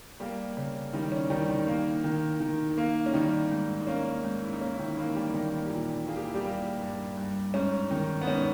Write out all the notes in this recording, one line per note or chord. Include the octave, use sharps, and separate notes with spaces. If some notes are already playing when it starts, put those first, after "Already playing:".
G3 A#3 G4
C#3
D#3 G3 D#4
C#4
D#3 G3 D#4
D#3 D#4
A#3
D#3
D#3
A#3
C#4
D#3 G3 D#4
G#2
D#4
A#3 C#4
G#2
E4
D#4
A#3 C#4
E4
D#3 D#4
E3 A#3 E4
G3 G4
D#3 A#3 D#4
G4
A#2 E3 E4
A#3 G#4
G4
E4
G3 G4
A#3
G2
G2
G#2 C#4
D#3 D#4
B3
G#2 C#4